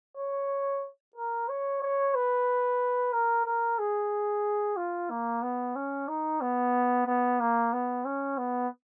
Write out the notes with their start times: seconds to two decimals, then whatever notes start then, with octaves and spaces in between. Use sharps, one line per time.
0.17 C#5
1.16 A#4
1.49 C#5
1.82 C#5
2.15 B4
3.13 A#4
3.46 A#4
3.79 G#4
4.77 F4
5.11 A#3
5.43 B3
5.76 C#4
6.08 D#4
6.41 B3
7.07 B3
7.40 A#3
7.73 B3
8.05 C#4
8.38 B3